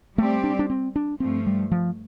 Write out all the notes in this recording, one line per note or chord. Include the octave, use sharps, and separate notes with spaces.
G3 A3 C4 G4 D5
D4
D4
C4
D4
G2 F3 A3 C4
G3
F3